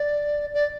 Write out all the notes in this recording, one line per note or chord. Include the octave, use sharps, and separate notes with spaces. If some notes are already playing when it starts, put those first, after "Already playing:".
Already playing: D5
D5